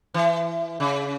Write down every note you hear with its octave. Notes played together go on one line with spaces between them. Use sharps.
E3
C#3